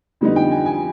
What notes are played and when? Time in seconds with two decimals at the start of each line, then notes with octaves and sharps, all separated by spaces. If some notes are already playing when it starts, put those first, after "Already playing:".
0.21 F2 D3 G3 B3 D#4
0.36 G5
0.51 G#5
0.66 G#5